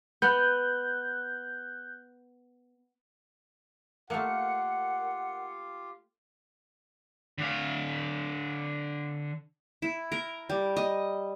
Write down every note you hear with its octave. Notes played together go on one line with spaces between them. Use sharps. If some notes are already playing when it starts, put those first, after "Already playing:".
B3 F#6 G6
A3 A#3 F4 G4 A#4 F5 F#5 C#7
D3 F5
E4
A#4
G3
D#5